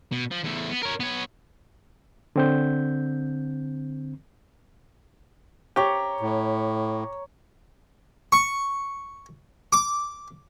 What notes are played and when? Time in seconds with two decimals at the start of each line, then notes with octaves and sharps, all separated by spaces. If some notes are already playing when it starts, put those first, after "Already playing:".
0.12 B2
0.31 F3
0.43 E2 A3
0.70 B3
0.83 A#4 C#5
1.00 B3 C#5
2.36 D3 C4 G6
5.76 G4 C#5 A#5
6.20 A2
8.32 C#6
9.73 D6